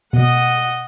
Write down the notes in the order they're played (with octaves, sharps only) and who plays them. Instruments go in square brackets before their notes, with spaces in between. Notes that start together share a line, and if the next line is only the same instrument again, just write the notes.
[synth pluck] B2 [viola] D#5 F#5